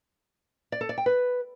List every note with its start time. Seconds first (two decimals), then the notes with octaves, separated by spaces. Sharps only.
0.72 D5
0.81 A4
0.89 D5
0.98 G5
1.06 B4